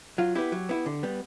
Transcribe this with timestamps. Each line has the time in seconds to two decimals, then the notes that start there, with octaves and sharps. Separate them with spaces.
0.18 F#3 F4
0.35 B3 E4 G4
0.52 F#3
0.69 B3 E4
0.86 D3
1.03 G3 B3